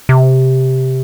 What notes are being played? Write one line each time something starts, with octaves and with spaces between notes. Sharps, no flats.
C3